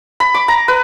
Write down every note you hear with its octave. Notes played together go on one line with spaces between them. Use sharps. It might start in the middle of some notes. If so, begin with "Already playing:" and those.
B5
D6
A#5
B4